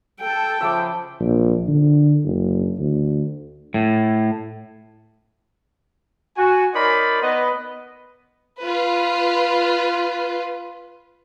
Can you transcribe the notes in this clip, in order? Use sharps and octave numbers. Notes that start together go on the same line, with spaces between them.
A4 G5
C#3 F3 E5 A5 D6
A#1
D3
F#1
D2
A2
F#4 G#5
D#4 A#4 C#5 D5 B5 C6
B3 B4 D#5
F4 B4